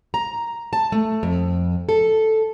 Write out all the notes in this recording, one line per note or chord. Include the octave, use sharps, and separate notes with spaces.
A#5
A5
A3
F2
A4